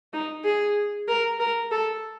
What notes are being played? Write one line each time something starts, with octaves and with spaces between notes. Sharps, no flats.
D#4
G#4
A#4
A#4
A4